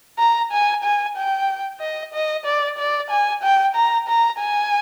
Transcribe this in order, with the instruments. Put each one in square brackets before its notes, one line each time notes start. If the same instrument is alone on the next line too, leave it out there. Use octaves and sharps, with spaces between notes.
[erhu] A#5
G#5
G#5
G5
D#5
D#5
D5
D5
G#5
G5
A#5
A#5
G#5